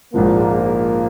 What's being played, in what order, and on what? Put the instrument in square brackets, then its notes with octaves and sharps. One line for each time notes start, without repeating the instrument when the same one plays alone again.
[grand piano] A#1 G#2 F3 [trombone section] A#3